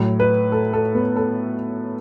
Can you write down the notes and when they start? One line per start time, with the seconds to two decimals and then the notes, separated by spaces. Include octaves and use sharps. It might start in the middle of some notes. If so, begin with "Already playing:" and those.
Already playing: A2 F#3
0.20 B4
0.52 A4
0.73 A4
0.95 B3
1.16 A4